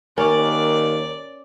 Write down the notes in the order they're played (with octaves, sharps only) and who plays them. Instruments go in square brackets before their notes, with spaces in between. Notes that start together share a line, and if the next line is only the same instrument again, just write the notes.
[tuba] D#2 [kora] C#4 [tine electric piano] A#4 [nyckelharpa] D5